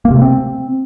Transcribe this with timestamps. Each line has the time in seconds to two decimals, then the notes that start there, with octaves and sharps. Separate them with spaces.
0.05 A#3
0.10 C3
0.16 A3
0.22 C4